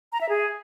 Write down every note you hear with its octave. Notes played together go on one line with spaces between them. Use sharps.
A#5
E5
G#4